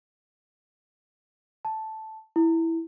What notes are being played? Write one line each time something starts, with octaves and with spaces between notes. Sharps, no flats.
A5
E4